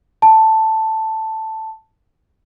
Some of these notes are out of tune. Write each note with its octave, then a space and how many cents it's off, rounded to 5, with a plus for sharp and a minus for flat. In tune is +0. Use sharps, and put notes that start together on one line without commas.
A5 +5